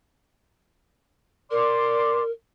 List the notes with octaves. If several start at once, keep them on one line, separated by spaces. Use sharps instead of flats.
A#4 D5 C6 D6